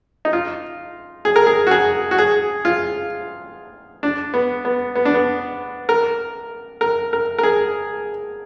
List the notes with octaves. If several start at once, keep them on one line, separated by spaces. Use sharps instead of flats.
D#4
F4
G#4
A#4
G#4
F#4
G#4
F#4
G#4
F4
D4
B3
B3
B3
D4
B3
A#4
A#4
A#4
A#4
G#4